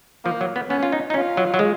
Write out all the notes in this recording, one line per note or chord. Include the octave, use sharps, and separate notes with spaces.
F3 A#3
F#3
B3
B3 C#4
F4
D#4
D#4
C#4 F4
F#3
F#3
G#3